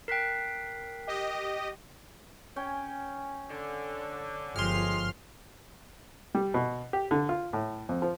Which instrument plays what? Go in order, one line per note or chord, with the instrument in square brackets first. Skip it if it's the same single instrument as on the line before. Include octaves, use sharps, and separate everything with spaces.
[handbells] A#4 G5 [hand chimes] F#6 B6 C7
[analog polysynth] G4 D#5
[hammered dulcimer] C#4 G5 G#5
[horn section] D3
[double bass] G1 F3 [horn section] G#3 [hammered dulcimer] G4 [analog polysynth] C6 F6
[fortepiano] G3
B2
G4
D3
F4
A2
F2
F3